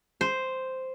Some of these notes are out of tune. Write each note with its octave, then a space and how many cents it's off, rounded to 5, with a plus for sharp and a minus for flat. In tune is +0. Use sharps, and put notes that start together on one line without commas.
C5 -5